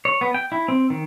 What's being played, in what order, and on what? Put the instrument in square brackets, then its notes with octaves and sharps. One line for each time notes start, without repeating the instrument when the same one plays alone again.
[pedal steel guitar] C#5
B3
G5
E4
C4
D#3